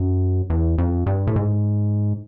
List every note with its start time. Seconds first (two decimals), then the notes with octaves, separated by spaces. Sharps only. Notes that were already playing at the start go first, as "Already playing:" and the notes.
Already playing: F#2
0.50 E2
0.78 F2
1.06 G2
1.27 A2
1.36 G#2